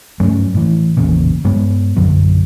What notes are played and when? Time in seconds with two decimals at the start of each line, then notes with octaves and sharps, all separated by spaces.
0.20 G2 F#3 A3 C#4
0.54 A2 E3
0.97 A1 E2 A#2 C#3
1.44 G2 G#3 B3
1.96 A#1 F#2 D3 F#3